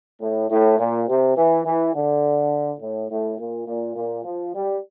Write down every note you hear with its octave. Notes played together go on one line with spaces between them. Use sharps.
A2
A2
A#2
C3
E3
E3
D3
A2
A2
A#2
A#2
A#2
F3
G3